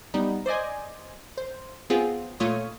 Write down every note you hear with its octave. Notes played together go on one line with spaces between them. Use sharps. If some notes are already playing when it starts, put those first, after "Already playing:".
G3 B3 D#4
C5 D5 D#5 G#5
C5
B3 C4 F4 G#4
A#2 A3 F4 C#5 D#6